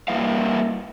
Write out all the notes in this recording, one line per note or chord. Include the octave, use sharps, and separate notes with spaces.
G3 A#3 E4 B4 F5